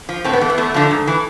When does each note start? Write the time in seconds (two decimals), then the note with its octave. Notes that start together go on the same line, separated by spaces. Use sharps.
0.09 F3
0.24 A2 C4
0.33 B3
0.41 E3 A3
0.50 B3
0.58 E2 A3
0.74 D3 F3
0.91 G#2
1.07 E3